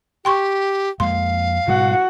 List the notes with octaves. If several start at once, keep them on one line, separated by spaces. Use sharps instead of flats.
G4 G5 C6 C#6
F2 G#3 A#3 F5 C6
G#2 B2 G3 F#4 F#5